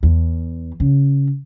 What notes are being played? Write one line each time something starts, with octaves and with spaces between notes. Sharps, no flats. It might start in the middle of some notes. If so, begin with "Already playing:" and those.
E2
C#3